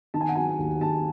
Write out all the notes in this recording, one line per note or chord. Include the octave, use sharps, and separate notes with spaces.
D#3 A5
G#5
F#5
F#3 G#5
D#2
D#2 A5